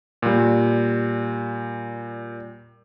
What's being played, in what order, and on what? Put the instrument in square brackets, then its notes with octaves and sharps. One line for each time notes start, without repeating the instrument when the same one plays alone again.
[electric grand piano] A#2 G3